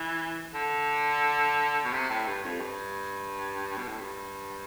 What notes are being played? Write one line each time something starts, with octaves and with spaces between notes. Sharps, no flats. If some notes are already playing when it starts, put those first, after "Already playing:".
Already playing: E3
D3
B2
C3
A2
G2
F2
G2
B2
A2
G2